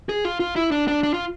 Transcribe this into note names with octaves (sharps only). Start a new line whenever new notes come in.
G#4
F4
F4
E4
D4
D4
D4
F4